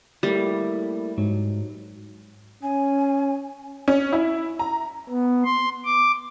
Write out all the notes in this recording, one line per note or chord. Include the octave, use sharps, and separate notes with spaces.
G3 A3 A#3 E4
G#2 F#3
C#4 G#5
C#4
E4
A#5
B3
C6
D6